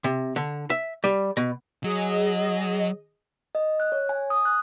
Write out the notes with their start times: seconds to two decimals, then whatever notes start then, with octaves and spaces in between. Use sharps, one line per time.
0.04 C3
0.36 D3
0.70 E5
1.04 G3
1.37 B2
1.84 F#3 G#4 D#5
3.55 D#5
3.80 F#6
3.92 C#5
4.09 G#5
4.30 D#6
4.45 F#6